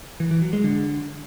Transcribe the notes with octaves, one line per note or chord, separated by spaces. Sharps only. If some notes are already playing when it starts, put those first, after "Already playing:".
E3
E3
F#3
G#3
D3